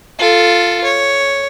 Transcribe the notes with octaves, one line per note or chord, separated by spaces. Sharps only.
F4 A4
C#5